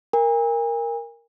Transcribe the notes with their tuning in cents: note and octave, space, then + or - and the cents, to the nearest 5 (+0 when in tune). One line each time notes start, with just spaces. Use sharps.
A#4 +0 G#5 -40